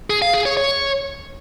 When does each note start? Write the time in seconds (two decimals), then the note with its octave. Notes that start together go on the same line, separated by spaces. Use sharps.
0.10 G#4
0.22 F5
0.34 G#4
0.45 C#5
0.57 C#5